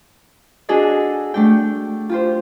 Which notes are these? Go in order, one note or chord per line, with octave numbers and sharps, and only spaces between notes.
D4 F#4 G#4 A4 D#5
A3 D4 G5
F4 G4 C5